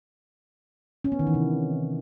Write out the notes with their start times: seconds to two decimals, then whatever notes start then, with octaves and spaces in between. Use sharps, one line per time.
1.04 C#4
1.12 B3
1.19 D#3
1.27 E3
1.34 C3